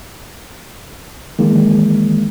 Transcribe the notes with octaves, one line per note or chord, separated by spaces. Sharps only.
D#3 E3 G#3 A#3